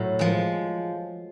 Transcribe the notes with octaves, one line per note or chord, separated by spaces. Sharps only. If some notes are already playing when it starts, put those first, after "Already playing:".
Already playing: A2 F#3
F3 G#3